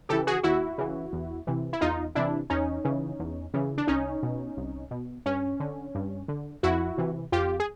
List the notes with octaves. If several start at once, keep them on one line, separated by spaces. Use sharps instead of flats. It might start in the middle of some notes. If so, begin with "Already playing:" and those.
C#3 E3 G4 A4
F#4 G#4
D#2 E4 F#4
C#3 E3
E2
C3 E3
E4
E2 D#4 F4
C3 E3 D4 E4
E2 C#4 D#4
C#3 E3
E2
C#3 E3
D4
C2 C#4 D#4
B2
C2
B2
G2 C#4
D3
G2
D3
F2 E4 F#4
C3 E3
F2 F4 G4
G#4